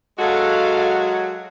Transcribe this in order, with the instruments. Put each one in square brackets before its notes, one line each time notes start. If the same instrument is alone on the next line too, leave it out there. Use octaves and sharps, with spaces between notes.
[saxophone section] F#3 G#3 F#4 [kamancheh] A4 F5